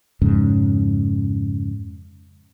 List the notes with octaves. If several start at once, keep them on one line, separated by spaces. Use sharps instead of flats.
F2 G#2 C#3